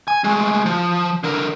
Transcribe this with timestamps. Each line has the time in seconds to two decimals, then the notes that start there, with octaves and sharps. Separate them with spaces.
0.08 G#5
0.24 G#3 A3
0.66 F3
1.24 D3 A#4